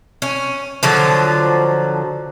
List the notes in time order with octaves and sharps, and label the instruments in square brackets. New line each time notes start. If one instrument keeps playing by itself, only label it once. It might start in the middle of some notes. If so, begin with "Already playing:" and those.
[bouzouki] C#4
D3 F3 F#3